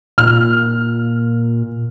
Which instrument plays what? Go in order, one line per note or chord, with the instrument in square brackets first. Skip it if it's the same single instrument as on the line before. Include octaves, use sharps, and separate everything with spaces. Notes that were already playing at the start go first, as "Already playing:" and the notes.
[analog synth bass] A#2 [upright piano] F6